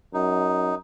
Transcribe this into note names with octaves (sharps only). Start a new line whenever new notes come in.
F#2 D#4